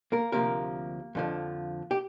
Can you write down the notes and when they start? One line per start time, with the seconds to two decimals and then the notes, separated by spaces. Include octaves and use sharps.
0.12 A#3 A#4
0.32 D2 C3 F3 A#3 A#4
1.15 F2 D3 F3
1.91 G4